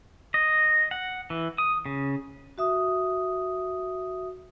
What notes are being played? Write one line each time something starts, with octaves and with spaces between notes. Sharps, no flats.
D#5
F#5
E3
D#6
C#3
F#4 E5 D#6